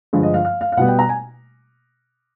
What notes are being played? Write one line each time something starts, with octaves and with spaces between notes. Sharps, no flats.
G2 D3 F3 G#3
D#5
F5
F5
F5
F5
B2 G3 B3 F#5
G5
A#5
G#5